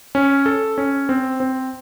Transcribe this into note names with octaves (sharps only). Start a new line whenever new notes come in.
C#4
A4
C#4
C4
C4